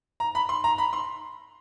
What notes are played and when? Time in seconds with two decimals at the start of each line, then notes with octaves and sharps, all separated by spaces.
0.20 A#5
0.35 B5
0.49 C6
0.64 A#5
0.78 B5
0.93 C6